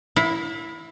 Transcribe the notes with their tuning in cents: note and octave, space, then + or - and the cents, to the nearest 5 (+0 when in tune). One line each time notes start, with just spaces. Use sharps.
E4 +0 F5 +40